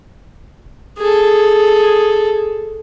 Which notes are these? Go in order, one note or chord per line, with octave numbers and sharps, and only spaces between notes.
G#4 A4